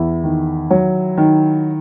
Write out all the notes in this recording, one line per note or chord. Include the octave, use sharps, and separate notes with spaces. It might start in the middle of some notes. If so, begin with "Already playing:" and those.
Already playing: E2 E4
D#3
F#3
D#3